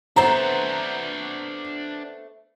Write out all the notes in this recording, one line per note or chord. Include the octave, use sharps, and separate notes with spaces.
A3 B3 C4 D4 C5 A#5